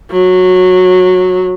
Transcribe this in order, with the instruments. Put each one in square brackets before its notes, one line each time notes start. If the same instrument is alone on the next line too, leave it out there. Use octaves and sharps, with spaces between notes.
[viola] F#3